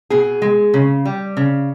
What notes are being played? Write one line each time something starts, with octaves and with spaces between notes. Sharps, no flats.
B2 G#4
G#3
C#3
G3
C#3